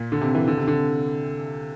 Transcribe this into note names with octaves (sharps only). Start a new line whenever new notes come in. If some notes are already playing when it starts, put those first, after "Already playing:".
Already playing: A#2
D3
C3
E3
D3
C3
D3